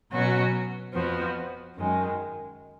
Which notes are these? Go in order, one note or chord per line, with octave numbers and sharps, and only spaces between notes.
B2 F#3 C#4 F#4
F2 F3 B3 F#4
F#2 D#3 G#3